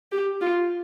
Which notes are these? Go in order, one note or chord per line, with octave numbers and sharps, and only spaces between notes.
G4
F4